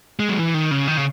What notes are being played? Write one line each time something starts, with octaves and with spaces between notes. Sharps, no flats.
G#3
F#3
E3
D#3
C#3
D#3
C#3